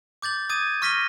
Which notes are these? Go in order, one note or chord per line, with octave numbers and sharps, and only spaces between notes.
D6 G6 A6 F#7
D6 D#6 G#6 A6 D#7
C#6 F6 A#6 B6 D#7 G7